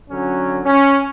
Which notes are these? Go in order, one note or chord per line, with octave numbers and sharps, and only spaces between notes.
D3 F#3 C#4
C#4